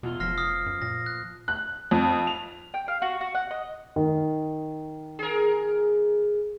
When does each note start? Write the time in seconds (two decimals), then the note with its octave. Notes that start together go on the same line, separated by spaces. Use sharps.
0.03 E2 B2 F4 C6
0.20 F1 F3 F6 A#6 C7
0.38 D#6 F6 C7
0.66 F#2
0.82 A#2 A#6
1.06 F#6
1.48 F#6
1.91 F2
2.27 F7
2.74 G5
2.88 F5
3.02 F#4
3.21 F#4
3.35 F#5
3.51 D#5
3.96 D#3
5.19 G#4 A#4